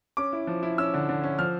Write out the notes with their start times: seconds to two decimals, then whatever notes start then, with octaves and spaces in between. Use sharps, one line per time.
0.17 C#4 D6
0.33 E4
0.47 F3
0.63 E4
0.78 C#4 E6
0.94 D3
1.09 D3
1.23 C#4
1.39 F3 F6